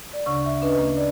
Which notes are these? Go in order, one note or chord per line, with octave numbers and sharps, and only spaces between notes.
D5
D2 C#3 D4 C#6
E5
C#4 D4 B4 D#5
A#3
D5